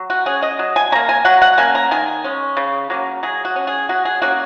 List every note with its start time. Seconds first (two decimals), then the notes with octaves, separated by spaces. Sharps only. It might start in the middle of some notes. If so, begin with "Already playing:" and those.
Already playing: F#3
0.10 F#4
0.26 C#4 G#4
0.43 D#5
0.59 F#3
0.76 G#5
0.92 A#3 C#4 A#5
1.09 G#5
1.25 F#3 F#5
1.42 F#5
1.58 A#3 C#4 G#5
1.75 A#5
1.91 D#3 G#5
2.24 G#3 C#4
2.57 C#3
2.90 F#3 A#3 C#4
3.23 F#3 G#4
3.45 F#4
3.56 C#4
3.67 G#4
3.89 F#3 F#4
4.05 G#4
4.22 A#3 C#4 F#4